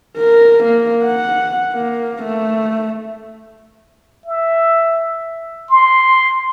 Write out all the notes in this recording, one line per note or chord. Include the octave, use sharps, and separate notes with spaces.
A#4
A#3
F#5
A#3
A3
E5
C6